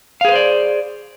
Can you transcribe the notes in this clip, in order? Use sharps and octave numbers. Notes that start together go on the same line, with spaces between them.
G#4 B4 C5 D5 F5